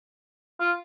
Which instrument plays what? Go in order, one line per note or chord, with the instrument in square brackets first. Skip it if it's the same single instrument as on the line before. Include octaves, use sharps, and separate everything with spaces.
[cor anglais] F4